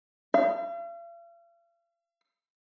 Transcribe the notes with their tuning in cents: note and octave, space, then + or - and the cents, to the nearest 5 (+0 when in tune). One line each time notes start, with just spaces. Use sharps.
F5 -45